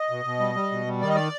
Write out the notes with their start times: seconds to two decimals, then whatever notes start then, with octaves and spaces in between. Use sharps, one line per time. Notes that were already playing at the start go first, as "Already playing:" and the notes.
Already playing: D#5
0.10 B2
0.25 B2
0.39 G3
0.55 G3
0.71 B2
0.86 G3
1.02 D#3 D5
1.09 D#5
1.15 D5